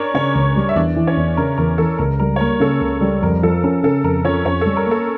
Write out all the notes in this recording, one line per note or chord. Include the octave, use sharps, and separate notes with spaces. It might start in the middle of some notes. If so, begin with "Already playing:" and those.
Already playing: C#4 D4 A#4 C#5 D5
C#3 C#4 C#5
C#2
G3
E5
E2 D4 D5
E3
C#4 C#5
E2
C#3 A#4
E2 A#4
E3 A4
C#2 A#4
G3 A#4
C#5
A#3 A#4
C#3 A4
C#2
G3
F2 A#4
F3 A4
C#4 A#4
C#3 A4
F2 A#4
F3 C#4 C#5
F2 C#4 C#5
G3 A4
A#4
A#3 A4